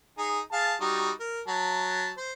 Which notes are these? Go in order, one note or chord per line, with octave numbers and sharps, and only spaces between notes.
D#4 G#4
G#4 F5 A5
G3 D#4 F#4
A#4
F#3 A5
C5